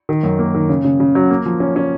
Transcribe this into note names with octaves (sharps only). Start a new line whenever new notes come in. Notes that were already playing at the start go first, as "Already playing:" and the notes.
D#3
F#2
A#3
D#3
C#3
C#3
C#3
F#3
A#3
F3
C#4
C#4